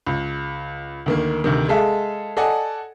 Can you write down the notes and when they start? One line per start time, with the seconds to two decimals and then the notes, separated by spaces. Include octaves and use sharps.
0.06 C#2
1.06 D2 D#3 A#3
1.44 D2 C3 D#3
1.68 G#3 G#4 A4 E5 F5
2.37 A4 D5 D#5 F#5 G#5